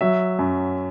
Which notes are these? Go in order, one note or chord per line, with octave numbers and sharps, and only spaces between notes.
F#3 E5
F#2